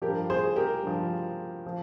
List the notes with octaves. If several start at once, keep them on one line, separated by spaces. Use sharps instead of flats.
F3 G4 A#4
G2
G#4 C5
G4 A#4
G2 F3
F3